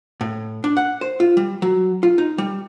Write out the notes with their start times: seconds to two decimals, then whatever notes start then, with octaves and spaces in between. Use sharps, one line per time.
0.21 A2
0.64 D4
0.77 F#5
1.01 C5
1.20 F4
1.37 G3
1.62 F#3
2.03 F4
2.18 D#4
2.38 G3